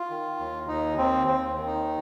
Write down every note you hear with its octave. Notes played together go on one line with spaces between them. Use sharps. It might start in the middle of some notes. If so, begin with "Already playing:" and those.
Already playing: F4
D#3
D#2
D#2 D#4
D#2 C4
D#2 C4
D#3
D#4